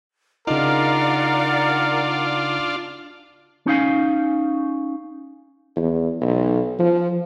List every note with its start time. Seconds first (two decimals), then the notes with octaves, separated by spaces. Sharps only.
0.47 C#3 D4 D#4 F4 A#4 D5 F5 F#5
3.66 C#4 D#4 F5 G#5
5.76 E2
6.21 B1
6.79 F3